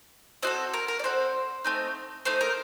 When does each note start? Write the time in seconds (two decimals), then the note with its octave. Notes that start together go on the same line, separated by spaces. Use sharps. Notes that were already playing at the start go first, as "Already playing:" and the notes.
0.43 C4 F#4 A4 D#5
0.74 A#4
0.88 A#4
0.99 D5
1.04 C4 F#4 A4 C5
1.64 A3 C4 D#4
2.25 A3 C4 D#4 C5
2.41 A#4